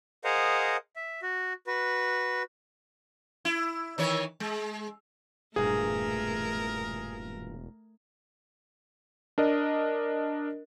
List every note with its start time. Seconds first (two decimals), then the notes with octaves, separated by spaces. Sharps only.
0.24 G#4 A#4 C5 D#5 F5 F#5
0.96 E5
1.22 F#4
1.67 F#4 B4
3.45 E4
3.98 D#3 E3 C#5
4.40 G#3
5.56 E1 G2 A#2 A3 G#4 A#4
9.38 D4 A#4 D#5